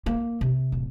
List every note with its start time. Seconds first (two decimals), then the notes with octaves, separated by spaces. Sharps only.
0.06 A#3
0.41 C3
0.72 D1